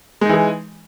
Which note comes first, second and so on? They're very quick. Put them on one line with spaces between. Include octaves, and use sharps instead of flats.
G#3 D#4 E3 G#4